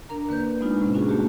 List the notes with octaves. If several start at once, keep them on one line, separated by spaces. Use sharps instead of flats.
D4 A#4 A#5
D3 A#3 B4 G6
G#3 B3 D4 D#4 F4
A2 C3 C#4
C#4 D4 F4 F#4 G#4
A3 A#3 F#4 G4